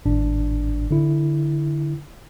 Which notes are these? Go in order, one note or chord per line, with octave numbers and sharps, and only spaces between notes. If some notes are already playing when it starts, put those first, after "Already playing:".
G#1 A2 D4
D3 E4